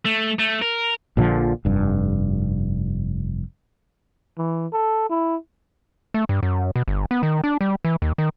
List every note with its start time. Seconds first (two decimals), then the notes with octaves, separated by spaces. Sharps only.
0.05 A3
0.39 A3
0.62 A#4
1.17 A#1 A#2 D3 F3
1.65 F1 G2
4.38 E3
4.73 A4
5.10 E4
6.14 A3
6.29 G2
6.43 F#2
6.76 B2
6.88 G1
7.11 B3
7.23 D#3
7.44 D4
7.61 G3
7.85 E3
8.02 D#2
8.18 D#3